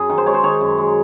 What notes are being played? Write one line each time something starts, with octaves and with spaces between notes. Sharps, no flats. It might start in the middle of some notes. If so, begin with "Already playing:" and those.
Already playing: F#2 G#4
D#3
C5
G#3 C#5
C5
D#3 C#5
F#2
G#3